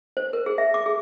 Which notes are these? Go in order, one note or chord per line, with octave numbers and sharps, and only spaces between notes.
C5
A#4
G#4
E5
D6
G#4